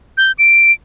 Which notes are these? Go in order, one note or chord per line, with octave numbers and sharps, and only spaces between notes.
G6
D7